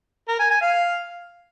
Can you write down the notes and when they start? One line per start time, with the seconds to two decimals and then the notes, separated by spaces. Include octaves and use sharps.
0.28 A#4
0.39 G#5
0.51 G#5
0.62 F5